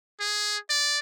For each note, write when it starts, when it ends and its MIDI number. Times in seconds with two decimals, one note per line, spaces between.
0.20 0.58 68
0.70 1.00 74